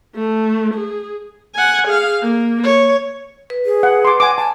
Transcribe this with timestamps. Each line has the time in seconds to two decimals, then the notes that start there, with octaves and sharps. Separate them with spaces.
0.15 A3
0.74 G#4
1.55 F#5 G#5
1.87 G#4 F5
2.22 A#3
2.63 C#5
3.50 B4
3.66 G#4
3.83 F#5
4.05 C6 D6
4.20 F#5 G#5 D6
4.38 G#5 A5